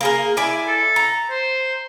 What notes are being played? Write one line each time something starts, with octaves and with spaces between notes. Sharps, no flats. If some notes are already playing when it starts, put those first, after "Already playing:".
A#3 G#4 A#4
E4 D5 G#5
A4
A#5
C5